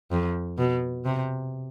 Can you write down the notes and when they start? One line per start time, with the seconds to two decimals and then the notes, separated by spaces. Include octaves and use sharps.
0.12 F2
0.58 B2
1.05 C3